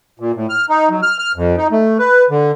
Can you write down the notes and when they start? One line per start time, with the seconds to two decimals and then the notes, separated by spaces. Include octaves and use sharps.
0.20 A#2
0.35 A2
0.49 F6
0.69 D#4
0.90 F#3
1.03 F6
1.19 F6
1.36 F2
1.57 D#4
1.71 A3
1.99 B4
2.30 D3